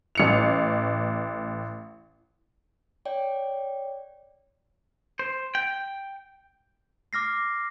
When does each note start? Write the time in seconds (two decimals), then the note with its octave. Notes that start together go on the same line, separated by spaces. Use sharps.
0.15 A1 C#7 F7
3.05 C#5 D5 G5
5.19 C5
5.55 G5
7.13 D6 F6 A#6 C7